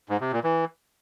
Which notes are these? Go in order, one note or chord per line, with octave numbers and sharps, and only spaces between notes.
G#2
C3
A#2
E3